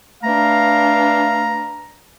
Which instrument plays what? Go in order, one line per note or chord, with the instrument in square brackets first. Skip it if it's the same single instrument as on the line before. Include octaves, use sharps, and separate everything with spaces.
[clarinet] A3 [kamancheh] D4 B4 [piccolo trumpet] F5 [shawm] A#5